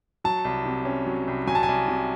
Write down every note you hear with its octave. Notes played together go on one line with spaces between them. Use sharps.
F#3 A5
C2
C3
C#4
F#3
C2
F#3 G#5
A5
G#5
C2
C3